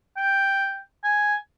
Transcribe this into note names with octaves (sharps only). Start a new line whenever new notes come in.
G5
G#5